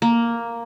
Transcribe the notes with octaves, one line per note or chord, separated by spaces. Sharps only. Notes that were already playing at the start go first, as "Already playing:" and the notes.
A#3